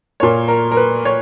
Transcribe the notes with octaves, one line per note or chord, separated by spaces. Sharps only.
A#2 A#3 C#5
A#4
A#4
B4
C#5